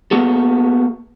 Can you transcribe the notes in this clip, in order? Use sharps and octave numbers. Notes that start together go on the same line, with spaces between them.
A#3 B3 F#4 G#4 A4